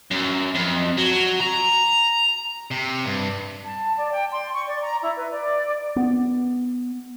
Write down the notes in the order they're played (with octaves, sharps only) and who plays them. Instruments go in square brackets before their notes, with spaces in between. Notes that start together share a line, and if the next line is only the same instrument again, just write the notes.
[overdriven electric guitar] F#2
F2
F#3
A#5
[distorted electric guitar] C3
G2
[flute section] A5
D5
G5
C6
C#6
D5
A#5
E4
B4
D5
[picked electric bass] B3